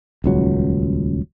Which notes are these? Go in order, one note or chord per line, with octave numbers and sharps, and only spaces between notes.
D#1 C#2 F#3